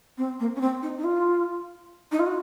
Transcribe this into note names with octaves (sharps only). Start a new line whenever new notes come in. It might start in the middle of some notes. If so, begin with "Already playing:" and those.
C4
A#3
C#4
C4
D#4
D#4
F4
D#4
F4
F#4